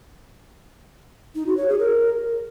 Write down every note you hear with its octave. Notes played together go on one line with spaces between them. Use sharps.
D#4
F#4
C#5
G#4
A#4